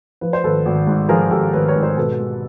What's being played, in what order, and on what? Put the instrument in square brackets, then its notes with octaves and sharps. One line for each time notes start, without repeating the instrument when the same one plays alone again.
[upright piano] F3 B4
C5
G#1 A4 B4
G#1
G#2
F3 G#4 A#4
G#1 G4 A4
G#1 B4 C#5
B4 C#5
G#2
A#4 C5
B2 A4 B4
G#3